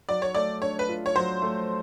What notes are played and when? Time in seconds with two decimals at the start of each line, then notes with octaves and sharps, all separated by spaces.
0.09 F#3 D5
0.22 C#5
0.35 A3 D5
0.62 D4 C#5
0.79 B4
0.89 F4
1.06 C#5
1.15 F#3 C5
1.42 A3